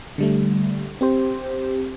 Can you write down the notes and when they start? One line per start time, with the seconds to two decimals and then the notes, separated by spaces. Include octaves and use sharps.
0.18 D3 G3 A3
1.01 C4 G4 C5